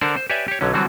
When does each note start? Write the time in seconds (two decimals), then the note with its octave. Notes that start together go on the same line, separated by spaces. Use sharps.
0.01 D3 D4 A#4 C5 F#5
0.16 C5
0.30 G4 B4 C#5 D5 E5 G#5
0.48 G4 C#5
0.61 B1 D3 F#3 C#4
0.73 D3 E3 F#3 G3 C4 F#4